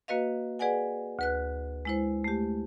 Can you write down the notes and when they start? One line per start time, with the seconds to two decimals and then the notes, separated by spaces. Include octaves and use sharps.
0.08 A#3 F#4 B4 D#5 F5
0.59 G#4 B4 D5 F#5 G#5
1.19 D2 B4 F#6
1.85 G#3 E4 C5
2.24 A3 G4